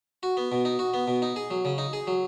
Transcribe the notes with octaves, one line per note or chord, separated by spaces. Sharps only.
F#4
B3
B2
D#4
F#4
B3
B2
D#4
G#4
F#3
C#3
D#4
G#4
F#3